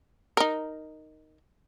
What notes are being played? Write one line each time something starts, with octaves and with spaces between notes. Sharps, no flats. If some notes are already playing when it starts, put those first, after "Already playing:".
D#4 A#4